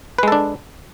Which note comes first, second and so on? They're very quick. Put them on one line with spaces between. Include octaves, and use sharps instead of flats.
B4 G#3 A4 D4